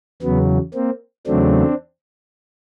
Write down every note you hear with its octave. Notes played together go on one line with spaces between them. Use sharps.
E2 C#3 F#3 B3
A#3 C4
E2 C#3 F#3 A3 C4 D4